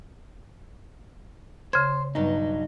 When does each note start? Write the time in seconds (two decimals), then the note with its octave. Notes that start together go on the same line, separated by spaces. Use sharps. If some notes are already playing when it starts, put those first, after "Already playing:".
1.73 C#3 C5 G#6
2.15 G2 B2 F#3 D#4